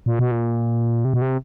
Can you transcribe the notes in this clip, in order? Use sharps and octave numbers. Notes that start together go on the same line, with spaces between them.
A#2
B2
A#2
C3
B2
C3